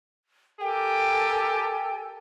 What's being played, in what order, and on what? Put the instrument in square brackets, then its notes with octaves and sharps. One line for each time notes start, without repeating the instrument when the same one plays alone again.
[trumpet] G4 [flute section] A4 A#4 G#5 [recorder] G5